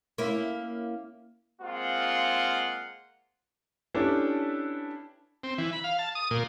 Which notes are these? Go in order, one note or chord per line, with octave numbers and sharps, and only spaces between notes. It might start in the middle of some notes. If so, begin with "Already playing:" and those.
A#3 C#4 E4
G#3 A#3 C4 F4 F#5
C#4 D4 E4 G4 A4 B4
C4
E3
B5
F5
A5
D#6
A#2